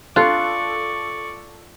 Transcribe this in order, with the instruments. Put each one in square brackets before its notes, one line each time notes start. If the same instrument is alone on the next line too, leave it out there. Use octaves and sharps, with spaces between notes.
[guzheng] F4 [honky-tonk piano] A4 F#6 [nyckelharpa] D5 C#6